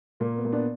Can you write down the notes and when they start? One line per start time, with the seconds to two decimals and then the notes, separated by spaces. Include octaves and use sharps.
0.20 A#2 A#3
0.37 B3
0.45 A#2
0.52 B3 D4